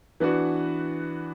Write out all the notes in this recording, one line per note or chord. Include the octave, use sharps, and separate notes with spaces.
E3 B3 D4 F#4